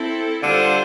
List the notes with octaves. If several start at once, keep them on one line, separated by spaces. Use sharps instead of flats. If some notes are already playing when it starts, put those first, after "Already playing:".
Already playing: C4 E4 A4
D3 G3 D4 F4 A4 C5